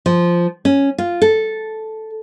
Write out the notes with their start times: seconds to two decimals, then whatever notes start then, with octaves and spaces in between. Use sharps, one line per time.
0.06 F3
0.65 C#4
0.98 F4
1.22 A4